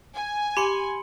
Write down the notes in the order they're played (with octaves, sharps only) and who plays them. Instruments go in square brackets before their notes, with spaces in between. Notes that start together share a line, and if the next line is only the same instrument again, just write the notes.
[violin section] G#5
[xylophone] G4 [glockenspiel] B5 C6 C#7